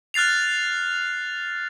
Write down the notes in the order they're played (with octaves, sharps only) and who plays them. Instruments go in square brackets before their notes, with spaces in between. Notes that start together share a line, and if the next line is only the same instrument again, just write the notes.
[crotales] F6 F#6 A6 C7 F7